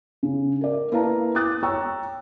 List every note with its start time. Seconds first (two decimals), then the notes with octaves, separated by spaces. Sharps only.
0.23 C#3
0.61 A#4 D5
0.91 A#3 E4 B4 F5 A5 A#5
1.35 D6 D#6 F#6 A6
1.63 C#5 G5 A#5 C#6 E6